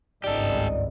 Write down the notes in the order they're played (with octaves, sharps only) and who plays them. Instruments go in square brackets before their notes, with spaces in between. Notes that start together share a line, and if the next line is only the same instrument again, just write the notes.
[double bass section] G#1 C#2 G2 [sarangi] D#4 [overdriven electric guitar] G4 A4 [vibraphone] D5